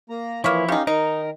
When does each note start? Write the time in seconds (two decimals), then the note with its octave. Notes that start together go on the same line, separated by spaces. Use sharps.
0.10 A#3 A#5
0.44 E3 F3 A#3 E4 C#5
0.68 D#3 C#4 D#4 G4 F5
0.87 D#3 D#4 A#4